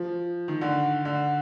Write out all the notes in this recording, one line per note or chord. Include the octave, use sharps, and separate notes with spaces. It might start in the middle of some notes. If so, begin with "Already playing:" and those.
Already playing: F3
D#3
D3
D3